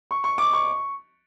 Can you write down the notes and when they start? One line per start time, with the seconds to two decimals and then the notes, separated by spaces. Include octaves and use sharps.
0.11 C#6
0.24 C#6
0.38 D6
0.53 C#6